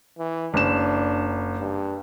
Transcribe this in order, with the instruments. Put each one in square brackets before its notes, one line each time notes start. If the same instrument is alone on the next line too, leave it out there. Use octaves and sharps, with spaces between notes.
[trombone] E3
[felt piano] F#1 E7 [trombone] D4
[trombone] G2